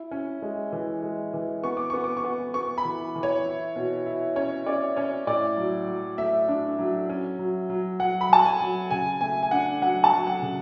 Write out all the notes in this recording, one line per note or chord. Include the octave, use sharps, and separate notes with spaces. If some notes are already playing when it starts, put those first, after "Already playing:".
Already playing: E4
C#4
G#3
E3
G#3
E3
B3 C#6
D6
B3 C#6
D6
C#6
B3
B3 C#6
B5
E3
E3
C#5
E4
B2
E4
C#4 C#5
C#4 D5
C#4 C#5
A2 D5
F#3
F#3
A3 E5
D4
F#3
C#4
F#3
F#3
F#3 F#5
B5
F#3 A5
G#5
F#3
C#3 G#5
A3 G#5
G#5
D4 F#5
F#3 F#5
A5
F#3
F#5
C#3